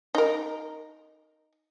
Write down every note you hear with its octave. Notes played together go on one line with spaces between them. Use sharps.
D#4 A#4